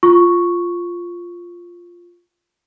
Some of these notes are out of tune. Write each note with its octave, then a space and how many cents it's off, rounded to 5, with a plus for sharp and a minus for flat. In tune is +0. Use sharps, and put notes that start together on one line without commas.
F4 +0 C#6 +0